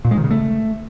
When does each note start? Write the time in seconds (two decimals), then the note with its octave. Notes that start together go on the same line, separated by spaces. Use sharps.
0.05 A#2
0.11 G#3
0.18 D#3
0.24 C#3
0.31 A3